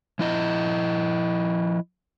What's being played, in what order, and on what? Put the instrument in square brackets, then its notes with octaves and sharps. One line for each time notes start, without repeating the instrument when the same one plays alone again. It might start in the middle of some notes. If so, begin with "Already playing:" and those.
[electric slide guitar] F3 E4 D#5